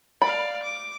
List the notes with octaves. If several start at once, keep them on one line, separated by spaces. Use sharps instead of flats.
D5 F5 B5
D6